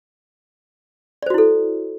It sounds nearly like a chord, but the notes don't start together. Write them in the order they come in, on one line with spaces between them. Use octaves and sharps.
D5 C5 F#4 E4 A4